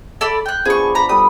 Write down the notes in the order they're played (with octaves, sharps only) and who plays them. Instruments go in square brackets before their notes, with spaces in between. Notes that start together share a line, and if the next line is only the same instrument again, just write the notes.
[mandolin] A4 D5 B5
G5 F#6
[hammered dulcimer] F3 B3 D4 [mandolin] G#4 C#6
[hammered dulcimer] D5
[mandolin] A#5 B5
[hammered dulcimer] G3 A4 B5 [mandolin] D#6